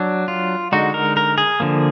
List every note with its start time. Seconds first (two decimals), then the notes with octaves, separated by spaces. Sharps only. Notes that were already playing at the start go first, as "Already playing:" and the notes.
Already playing: F#3 D4
0.28 F4
0.72 D3 G#3 D#4 F#4
0.94 A#4
1.17 A#4
1.38 G#4
1.60 D3 F3 A#3